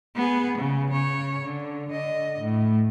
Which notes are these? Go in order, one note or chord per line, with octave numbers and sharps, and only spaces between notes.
B3 G#4
C#3
C#3 C#5
D3
D3 D#5
A2